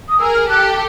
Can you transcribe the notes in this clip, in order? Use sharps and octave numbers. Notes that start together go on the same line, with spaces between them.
D#6
G#4 A#4 E6
F6
G4 A4 F#6